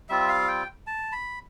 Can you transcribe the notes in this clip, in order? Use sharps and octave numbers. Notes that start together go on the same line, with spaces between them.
G3 C4 F4 E5
F5
G5
A5
B5